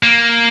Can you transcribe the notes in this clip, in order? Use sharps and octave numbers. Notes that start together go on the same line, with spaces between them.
A#3